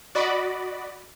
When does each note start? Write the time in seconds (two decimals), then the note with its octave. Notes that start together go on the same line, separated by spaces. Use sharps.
0.15 F#4 D5 D#5 B5